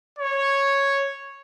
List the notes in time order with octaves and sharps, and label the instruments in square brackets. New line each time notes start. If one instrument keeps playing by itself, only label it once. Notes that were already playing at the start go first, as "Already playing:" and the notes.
[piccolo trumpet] C#5